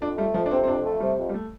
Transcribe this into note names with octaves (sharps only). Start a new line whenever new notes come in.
F2 D4
G3 A3
F2 F3
D4
C3 C4
C4
F2 D4
A3
C3 G3
F2
G3
A3